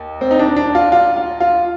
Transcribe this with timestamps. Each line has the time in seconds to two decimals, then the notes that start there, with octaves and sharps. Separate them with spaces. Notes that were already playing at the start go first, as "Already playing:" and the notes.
Already playing: D#2
0.21 C4
0.31 D#4
0.39 D4
0.56 D4
0.75 F4
0.92 F4
1.16 F4
1.40 F4